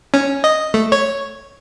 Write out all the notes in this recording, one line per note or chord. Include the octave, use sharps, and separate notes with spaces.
C#4
D#5
A3
C#5